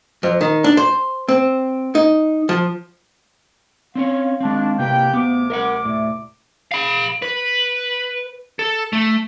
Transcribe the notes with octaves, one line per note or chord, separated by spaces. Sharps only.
F2
D#3
D4
C5
C4
D#4
F3
C4 C#4 C#5 F5
G#3 C4 D4
C3 A#3 G4 B4 G5
D2 C3 B3 D6
A#4 E5 F#5
A2 D5 E5
F5 B5
B4
A4
A3